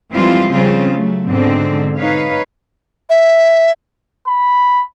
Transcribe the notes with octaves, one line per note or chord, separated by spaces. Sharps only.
E3 F3 G3 G#3 C4 F4
C#3 G3 C4 F4
F#3 A3
G#2 B2 D3 C4
D#4 B4 C#5 F5
E5
B5